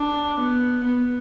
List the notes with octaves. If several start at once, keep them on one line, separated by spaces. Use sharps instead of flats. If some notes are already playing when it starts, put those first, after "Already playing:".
Already playing: D4
B3
B3